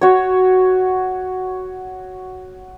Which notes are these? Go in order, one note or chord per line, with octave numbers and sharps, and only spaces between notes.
F#4 C#5